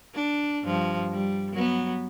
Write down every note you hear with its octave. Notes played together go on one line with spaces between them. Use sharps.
D4
G2 F3
G3
F#3 B3